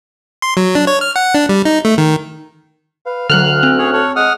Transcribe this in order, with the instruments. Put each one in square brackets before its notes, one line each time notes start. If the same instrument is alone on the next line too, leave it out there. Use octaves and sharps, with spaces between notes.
[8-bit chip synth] C6
F#3
D4
C#5
F6
F#5
D4
G3
D#4
A3
D#3
[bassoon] B4 [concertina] F5
[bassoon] D2 [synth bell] D3 F#3 [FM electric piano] F6 F#6
[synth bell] C4
[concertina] C#4 G#4 C#5
A4 C#5
[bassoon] G#3 [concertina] F#5 D#6 F6